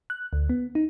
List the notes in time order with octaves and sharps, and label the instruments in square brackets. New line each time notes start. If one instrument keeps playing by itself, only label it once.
[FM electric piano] F#6
D2
B3
D#4